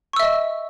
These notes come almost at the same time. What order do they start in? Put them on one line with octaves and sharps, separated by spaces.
C#6 E6 E5 D#5